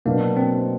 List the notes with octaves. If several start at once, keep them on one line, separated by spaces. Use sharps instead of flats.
B2 F#3 A#3 B3 D4
C4